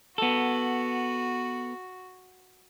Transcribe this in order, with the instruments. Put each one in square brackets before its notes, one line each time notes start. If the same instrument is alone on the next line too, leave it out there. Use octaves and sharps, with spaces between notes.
[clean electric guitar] B3 A4 [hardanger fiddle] F#4